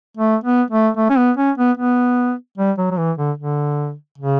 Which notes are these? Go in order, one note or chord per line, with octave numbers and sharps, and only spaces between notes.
A3
B3
A3
A3
C#4
B3
C#4
B3
B3
G3
F#3
F#3
E3
D3
D3
C#3